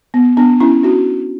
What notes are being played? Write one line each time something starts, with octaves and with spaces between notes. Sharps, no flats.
B3
B3 D4
C#4 E4
D4 F#4